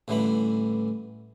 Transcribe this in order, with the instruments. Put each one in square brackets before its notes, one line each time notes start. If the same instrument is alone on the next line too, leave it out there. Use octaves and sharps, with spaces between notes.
[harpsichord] A1 D3 E3 G3 B5